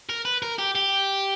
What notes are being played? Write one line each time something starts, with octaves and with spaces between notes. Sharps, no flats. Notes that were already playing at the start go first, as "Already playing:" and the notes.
A#4
B4
A#4
G4
G4